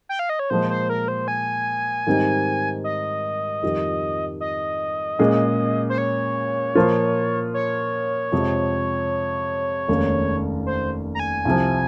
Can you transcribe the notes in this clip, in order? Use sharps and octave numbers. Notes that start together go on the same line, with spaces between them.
G5
F5
D#5
C#5
A#2 F3 G#3 C5
C5
A#4
C5
G#5
G#2 D#3 G3 C4 D#4
D#5
F2 D#3 G3
D#5
A#2 G#3 C#4 G#4
C5
C#5
A#2 F3 A#3 F4 C5
C#5
F2 C3 F3 G#3
F1 D#2 D#3 G#3 C#4
C5
A#5
G#5
C2 C3 F3